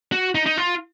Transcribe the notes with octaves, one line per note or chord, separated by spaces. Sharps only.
F#4
D#4
D#4
F4